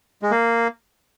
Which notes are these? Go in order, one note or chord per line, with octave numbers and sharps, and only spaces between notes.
G#3
A#3